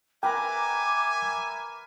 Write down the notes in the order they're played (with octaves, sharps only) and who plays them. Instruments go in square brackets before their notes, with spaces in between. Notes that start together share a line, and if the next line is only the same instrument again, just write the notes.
[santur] A#4 B4 A#5 [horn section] E5 G#5 [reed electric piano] G5 [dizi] D6